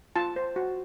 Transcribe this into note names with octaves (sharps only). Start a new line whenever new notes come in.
F4 A5
C5
F#4